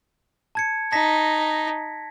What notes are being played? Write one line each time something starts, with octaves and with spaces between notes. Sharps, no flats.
A5 G#6 C#7
D#4 A5 A#6 B6